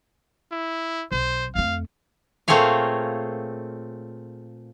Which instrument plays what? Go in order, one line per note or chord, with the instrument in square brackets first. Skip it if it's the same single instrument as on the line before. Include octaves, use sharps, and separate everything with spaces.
[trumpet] E4
[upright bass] B1 [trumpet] C5
[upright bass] F2 A3 [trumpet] F5
[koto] A#2 A3 C4 G#4 C#5 F5